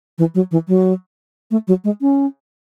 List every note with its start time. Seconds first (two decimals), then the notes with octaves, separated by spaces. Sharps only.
0.18 E3
0.35 F#3
0.51 E3
0.68 F#3
1.51 A3
1.68 F#3
1.84 G#3
2.01 C#4